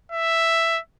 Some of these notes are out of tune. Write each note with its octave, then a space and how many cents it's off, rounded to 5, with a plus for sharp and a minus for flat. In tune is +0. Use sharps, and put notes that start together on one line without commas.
E5 +5